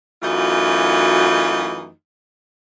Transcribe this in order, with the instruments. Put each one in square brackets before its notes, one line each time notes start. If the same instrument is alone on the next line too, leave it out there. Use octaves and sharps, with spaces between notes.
[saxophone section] F#2 E3 A3 D#4 F4 F#4